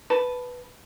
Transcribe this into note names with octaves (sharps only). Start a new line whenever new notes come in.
B4 A5